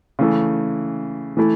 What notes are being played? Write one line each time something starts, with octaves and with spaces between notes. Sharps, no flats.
C#3 E3 A3
E3 A3 E4